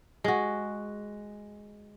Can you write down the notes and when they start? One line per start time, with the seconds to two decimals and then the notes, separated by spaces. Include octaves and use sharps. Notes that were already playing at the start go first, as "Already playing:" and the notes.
0.24 G#3 F#4